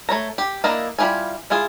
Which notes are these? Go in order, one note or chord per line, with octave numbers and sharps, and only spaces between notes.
A3 C#5 A#5
G4
A#3 D4 E4 A#4 D#5
G3 E4 F4 G4 G#5
G#3 E4 F4 G#4